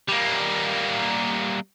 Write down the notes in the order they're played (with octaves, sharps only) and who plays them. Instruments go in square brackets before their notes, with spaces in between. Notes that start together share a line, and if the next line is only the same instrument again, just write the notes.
[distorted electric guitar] G3 A#3